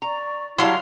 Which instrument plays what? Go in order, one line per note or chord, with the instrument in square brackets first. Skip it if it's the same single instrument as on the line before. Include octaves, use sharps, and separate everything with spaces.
[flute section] D5 C#6 [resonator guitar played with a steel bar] A#5
[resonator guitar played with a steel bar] F#3 G3 [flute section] E4 A#4 A5 [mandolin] F5 C6